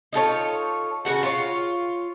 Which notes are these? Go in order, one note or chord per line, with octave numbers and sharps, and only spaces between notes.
D#4 F4 A4 C#5
C#3 B3 F#4 F#5
F4 C#5